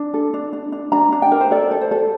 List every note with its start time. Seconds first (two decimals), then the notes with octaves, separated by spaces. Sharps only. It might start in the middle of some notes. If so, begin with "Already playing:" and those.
Already playing: D4
0.14 A4
0.34 D4
0.53 D4
0.72 D4
0.92 D4 A#5
1.12 D4
1.22 G5
1.31 A#4
1.41 C5
1.51 A4 D5
1.71 A4
1.81 C5
1.91 A4